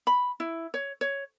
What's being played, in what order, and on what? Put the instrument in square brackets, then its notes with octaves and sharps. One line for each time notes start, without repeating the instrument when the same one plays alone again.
[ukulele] B5
E4
C#5
C#5